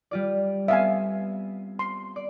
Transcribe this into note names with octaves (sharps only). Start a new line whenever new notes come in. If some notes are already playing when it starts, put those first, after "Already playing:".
G3 F4 D5
B3 C4 E5 F5 G#5
C6
D5